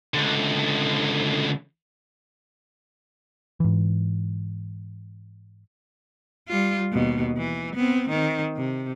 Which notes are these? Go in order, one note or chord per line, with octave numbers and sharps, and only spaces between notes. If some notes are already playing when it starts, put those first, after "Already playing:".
C#2 D3
G#2 E3
G3 F4
D#2 B2
E3
B3 C4
D#3 C4
C3